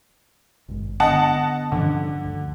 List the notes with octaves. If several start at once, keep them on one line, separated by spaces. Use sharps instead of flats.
G#1 G2 G#3
D3 B3 D4 D#5 F#5 A5
G2 D3 F3 C#4
D2